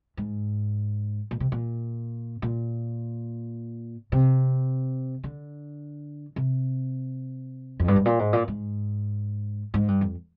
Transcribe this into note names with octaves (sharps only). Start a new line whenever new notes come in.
G#2
A#2
C3
A#2
A#2
C3
D3
C3
F2
G2
G#2
A#2
G#2
A#2
G#2
G#2
G2
F2